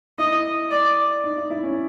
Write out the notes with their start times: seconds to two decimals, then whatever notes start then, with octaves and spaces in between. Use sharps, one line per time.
0.18 E4 D#5
0.71 D5
1.24 D#4
1.37 E4
1.50 E4
1.63 C#4